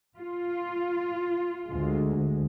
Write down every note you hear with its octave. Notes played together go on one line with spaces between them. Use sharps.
F4
D2 G#3